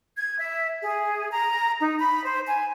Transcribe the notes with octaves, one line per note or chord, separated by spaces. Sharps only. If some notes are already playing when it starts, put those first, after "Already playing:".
G#6
E5
G#4
A#5
D#4
B5
C5
G#5